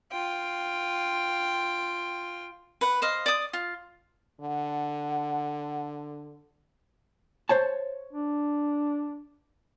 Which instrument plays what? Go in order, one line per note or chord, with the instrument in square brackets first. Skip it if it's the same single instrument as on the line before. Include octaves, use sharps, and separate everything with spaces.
[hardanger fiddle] F4 G5
[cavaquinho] B4 F#5
C5 D#5 F5
D5 D#6
F4
[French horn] D3 [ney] F#5
[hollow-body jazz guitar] C5 C#5 A5
[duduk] D4